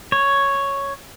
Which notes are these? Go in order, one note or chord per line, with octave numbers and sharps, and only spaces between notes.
C#5